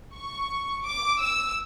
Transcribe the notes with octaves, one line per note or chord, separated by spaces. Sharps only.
C#6
D6
E6